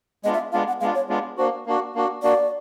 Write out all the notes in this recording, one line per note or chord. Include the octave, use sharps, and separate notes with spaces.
G#3 B3 D4 F4 D#5
E5
G#3 B3 D4 F4 F5
F#5
G#3 B3 D4 F4 F5
C#5
G#3 B3 D4 F4
A#3 D4 F#4 C5
A#3 D4 F#4
A#3 D4 F#4
A#3 D4 F#4 D5